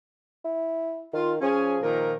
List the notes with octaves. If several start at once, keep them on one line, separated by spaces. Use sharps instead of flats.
E4
D#3 F4
F3 C#4 G#4
A#2 D#3 A#4